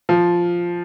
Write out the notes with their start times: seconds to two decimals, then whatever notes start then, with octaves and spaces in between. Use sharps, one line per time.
0.09 F3